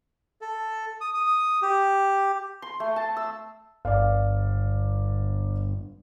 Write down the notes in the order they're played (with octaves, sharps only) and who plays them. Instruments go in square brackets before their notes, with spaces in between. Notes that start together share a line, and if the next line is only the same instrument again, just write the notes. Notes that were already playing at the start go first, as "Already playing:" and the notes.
[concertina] A4
D#6
D#6
G4
[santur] C6
A3
A5
E6
[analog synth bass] G1 [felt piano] D5 F5